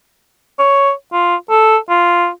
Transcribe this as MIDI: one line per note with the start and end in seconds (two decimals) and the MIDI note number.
0.59 0.92 73
1.12 1.35 65
1.50 1.77 69
1.89 2.29 65